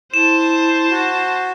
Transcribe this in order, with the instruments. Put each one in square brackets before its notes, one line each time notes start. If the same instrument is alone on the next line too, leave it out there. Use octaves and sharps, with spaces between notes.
[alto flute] E4 [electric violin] C5 A5 [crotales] E7
[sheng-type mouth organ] F#4